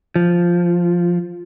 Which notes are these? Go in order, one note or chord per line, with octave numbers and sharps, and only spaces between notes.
F3